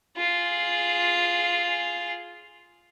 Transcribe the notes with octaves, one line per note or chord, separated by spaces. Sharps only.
F4 G#4